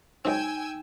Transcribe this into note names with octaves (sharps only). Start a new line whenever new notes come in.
C#2 F#3 C4 D#4 G5 G#5 E6